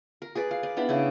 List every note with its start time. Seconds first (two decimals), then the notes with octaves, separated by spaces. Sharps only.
0.22 A#4
0.35 G#4 B4 D5
0.51 F5
0.63 D5
0.77 B3 D4 E4 B5
0.89 C#3 D4 E4